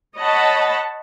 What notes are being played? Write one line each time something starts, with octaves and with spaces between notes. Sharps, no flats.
C#5 D#5 F#5 A5 B5